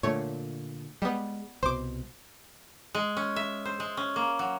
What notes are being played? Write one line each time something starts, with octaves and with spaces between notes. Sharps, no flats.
A#2 D3 A3 C#5
G3 G#3 B3
C2 B2 C5 D6
G#3
C#4
E5
C5
G#3
C#4
A#3
F#3